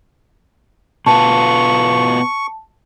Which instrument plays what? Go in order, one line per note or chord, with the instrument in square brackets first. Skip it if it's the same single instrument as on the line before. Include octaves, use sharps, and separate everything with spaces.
[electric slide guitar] B2 B3 F4 [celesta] A5 [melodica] C#6